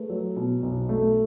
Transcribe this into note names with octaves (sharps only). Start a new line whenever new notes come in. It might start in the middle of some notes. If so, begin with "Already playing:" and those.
Already playing: A3 G#4 B4
F#3
B2
B1
A3